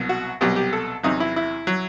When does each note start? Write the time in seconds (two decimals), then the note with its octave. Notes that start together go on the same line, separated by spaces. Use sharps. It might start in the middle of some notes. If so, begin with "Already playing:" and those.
Already playing: C2 B2 F#3
0.09 F#4
0.41 C2 B2 F#3 G4
0.56 G4
0.73 A4
1.03 E2 C3 F#3 D#4
1.20 E4
1.36 E4
1.67 F#3